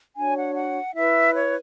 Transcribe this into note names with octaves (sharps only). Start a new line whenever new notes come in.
D4 F#4 C#5 G#5
F#5
F#5
E4 B4 E5
C#5